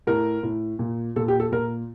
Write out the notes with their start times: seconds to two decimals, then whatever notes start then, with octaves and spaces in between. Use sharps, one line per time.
0.07 A2 A#4
0.43 A2
0.79 A#2
1.16 A#2 A4
1.28 G4
1.40 A4
1.52 A#2 A#4